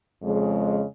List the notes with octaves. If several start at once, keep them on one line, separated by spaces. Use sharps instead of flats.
F2 C#3 G#3